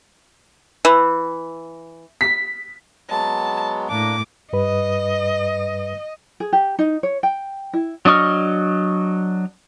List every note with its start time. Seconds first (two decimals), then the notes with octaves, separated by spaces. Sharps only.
0.85 E3
2.21 B6
3.10 F#3 G#3 B3 A5
3.89 A2 A#3 D4 D6
4.53 G2 G3 B4 D#5
6.40 G#4
6.53 G4
6.79 D#4
7.03 C#5
7.23 G5
7.73 E4
8.05 F#3 D4 D#5 C#6 F6